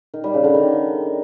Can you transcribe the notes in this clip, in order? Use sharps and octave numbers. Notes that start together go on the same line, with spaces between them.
D#3
G3
C#3
D3
D#3